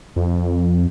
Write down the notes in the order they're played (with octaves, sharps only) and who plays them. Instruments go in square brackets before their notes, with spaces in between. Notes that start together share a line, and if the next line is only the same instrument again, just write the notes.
[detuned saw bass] F2